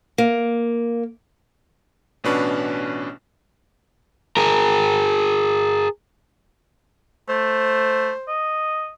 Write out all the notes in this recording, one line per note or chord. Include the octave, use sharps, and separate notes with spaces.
A#3
A1 B2 C#4 D4 B4 C#6
G#4 A#4
A3 C5
D#5